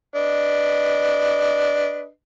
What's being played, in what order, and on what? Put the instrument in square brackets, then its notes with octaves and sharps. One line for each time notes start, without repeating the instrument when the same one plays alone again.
[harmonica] D4 B4 D#5